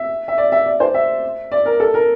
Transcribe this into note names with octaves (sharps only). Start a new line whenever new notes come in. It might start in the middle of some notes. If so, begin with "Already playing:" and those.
Already playing: E5
E5
D5
E5
D5
C5
E5
D5
A#4
A4
A#4